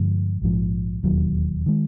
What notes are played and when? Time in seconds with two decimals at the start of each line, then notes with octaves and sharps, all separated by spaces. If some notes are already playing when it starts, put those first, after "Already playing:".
Already playing: G2 D3 F3 G#3
0.42 A#1 G#2 F3
1.03 E1 D#2 D#3 F#3
1.66 D#3 G#3